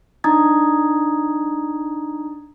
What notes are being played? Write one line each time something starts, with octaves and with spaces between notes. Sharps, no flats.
D4 D#4 A#5 D#6 G#6 A6